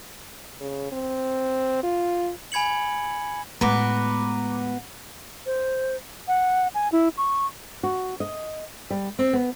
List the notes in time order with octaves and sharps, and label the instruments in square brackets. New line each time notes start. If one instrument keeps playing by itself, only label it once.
[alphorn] C#3
C4
F4
[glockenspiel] G#5 B5 G#6 C#7 F#7
[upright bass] A2 G#3 [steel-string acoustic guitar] B3 F#4 B4 [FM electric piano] A#5 B5 D6
[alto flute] C5
F#5
G#5
E4
C#6
[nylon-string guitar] F#4
D#5
G3
C4
B3